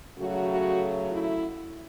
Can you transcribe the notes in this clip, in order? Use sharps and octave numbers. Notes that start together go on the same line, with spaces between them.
C#3 F#3 A3 F#4
F#4
E4